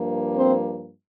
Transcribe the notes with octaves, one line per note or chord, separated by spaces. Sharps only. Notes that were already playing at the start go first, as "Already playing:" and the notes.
Already playing: G2 F3 A#3
C4 C5